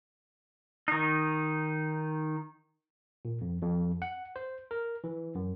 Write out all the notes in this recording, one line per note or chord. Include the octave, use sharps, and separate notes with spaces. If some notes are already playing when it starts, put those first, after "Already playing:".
D#3 D#4
A#2
F2
F2
F#5
C5
A#4
E3
F#2